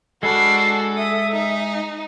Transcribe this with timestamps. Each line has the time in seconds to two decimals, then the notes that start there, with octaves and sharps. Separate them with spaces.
0.23 G#3 D4 F#4 A4 B5 F6 C7
0.97 E5 D#6
1.32 D#4